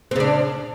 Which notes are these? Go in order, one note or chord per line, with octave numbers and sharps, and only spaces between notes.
C#3 C4 D4